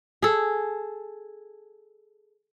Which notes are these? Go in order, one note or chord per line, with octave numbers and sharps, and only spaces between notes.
G#4 A4